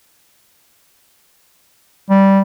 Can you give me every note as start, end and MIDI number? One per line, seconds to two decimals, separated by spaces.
2.10 2.42 55